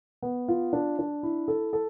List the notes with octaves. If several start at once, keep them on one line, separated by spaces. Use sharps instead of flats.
B3
F4
D4
D4
E4
A4
A4